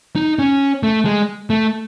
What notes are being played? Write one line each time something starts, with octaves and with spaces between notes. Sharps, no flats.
D#4
C#4
A3
G#3
A3